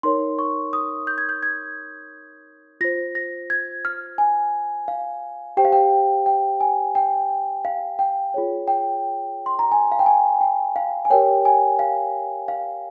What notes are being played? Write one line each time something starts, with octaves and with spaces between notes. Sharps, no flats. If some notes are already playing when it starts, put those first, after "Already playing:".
D#4 A#4 C#5 C6
C#6
D#6
G6
G#6
G6
G#6
F4 C5 A#6
A#6
G#6
F6
G#5
F5
G4 C5 G5
F5
G5
G5
G#5
G5
F5
G5
F4 G#4 C#5
G5
C6
A#5
G#5
F5
G5
G#5
G5
F5
G#5
G4 A#4 C#5 G5
G#5
F5
F5